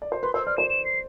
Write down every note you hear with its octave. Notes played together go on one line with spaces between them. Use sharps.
D5
C5
B4 C6
C5 E6
D5 F6
C5 E7
E7
C7